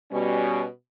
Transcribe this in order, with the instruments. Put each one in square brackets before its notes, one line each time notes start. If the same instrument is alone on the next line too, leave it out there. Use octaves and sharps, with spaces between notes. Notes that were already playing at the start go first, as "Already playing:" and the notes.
[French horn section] B2 G3 C#4